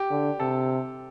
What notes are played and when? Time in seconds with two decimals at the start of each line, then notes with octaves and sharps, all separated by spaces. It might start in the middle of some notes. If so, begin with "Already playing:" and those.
Already playing: G4
0.11 D3
0.39 C3 A4